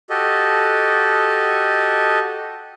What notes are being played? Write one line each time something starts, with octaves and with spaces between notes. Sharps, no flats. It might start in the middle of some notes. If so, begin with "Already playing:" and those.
F#4 G4 A4 D#5